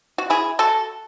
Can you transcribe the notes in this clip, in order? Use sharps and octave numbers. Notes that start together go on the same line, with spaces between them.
F#4
E4 G#4
F#4 A4